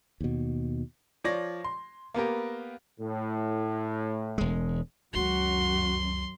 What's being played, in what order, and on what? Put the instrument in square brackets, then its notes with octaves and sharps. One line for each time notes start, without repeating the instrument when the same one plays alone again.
[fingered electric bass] D#2 B2
[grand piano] F3 C#5 D5 A#6
C6
A#3 B3 G4 A#4
[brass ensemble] A2
[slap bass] E1 G#3
[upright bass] C#2 D#3 [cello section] F#2 F#3 [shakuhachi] F#4 [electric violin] C6